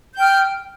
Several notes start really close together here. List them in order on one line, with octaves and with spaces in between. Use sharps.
G6 G5 F6